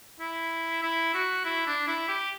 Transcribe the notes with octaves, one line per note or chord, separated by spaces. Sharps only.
E4
E4
F#4
E4
D4
E4
G4